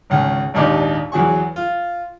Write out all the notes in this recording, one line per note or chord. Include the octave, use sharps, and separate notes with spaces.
G#1 C#2 C#4
G#1 D#2 A#2 D4 D#4 G4
E2 E3 F#3 G#4 G#5 C#6
F4